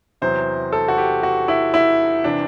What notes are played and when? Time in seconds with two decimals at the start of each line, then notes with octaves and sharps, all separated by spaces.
0.22 E2 C3 F#3 C5
0.73 A4
0.88 F#4
0.98 G4
1.23 F#4
1.48 E4
1.74 E4
2.24 C3 E3 D4